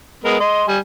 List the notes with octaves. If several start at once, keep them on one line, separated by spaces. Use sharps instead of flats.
G#3 B3 A#4
D#5 C6
G3 G#5